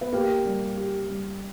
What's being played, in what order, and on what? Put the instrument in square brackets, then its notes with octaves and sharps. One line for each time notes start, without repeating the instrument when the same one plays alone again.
[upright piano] B3
[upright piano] A#3 [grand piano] G4
[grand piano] G3
G4
G3